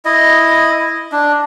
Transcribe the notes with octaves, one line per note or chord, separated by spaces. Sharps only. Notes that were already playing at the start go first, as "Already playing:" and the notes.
E4 D#5
D4